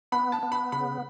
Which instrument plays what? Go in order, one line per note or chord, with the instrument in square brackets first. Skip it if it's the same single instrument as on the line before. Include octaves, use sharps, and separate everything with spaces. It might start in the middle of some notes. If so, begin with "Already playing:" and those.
[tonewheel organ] B3 [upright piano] B5
[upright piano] A5
[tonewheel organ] B3
[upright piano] B5
[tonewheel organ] C#3 [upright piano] B5